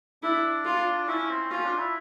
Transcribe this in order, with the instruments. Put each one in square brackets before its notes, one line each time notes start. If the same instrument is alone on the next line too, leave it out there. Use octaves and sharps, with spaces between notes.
[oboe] D4 [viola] E4
[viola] F4
[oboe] C#4 [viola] E4
[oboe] C4
[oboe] C#4 [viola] F4
[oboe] D4
E4